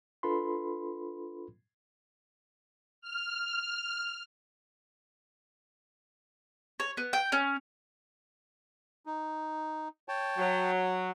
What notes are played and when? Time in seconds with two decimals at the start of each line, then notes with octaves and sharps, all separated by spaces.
0.23 D4 F4 A4 B4 B5 C6
3.01 F6
6.80 C#5
6.97 B3
7.13 G5
7.32 C#4
9.06 D#4
10.08 C#5 G5 A5
10.38 F#3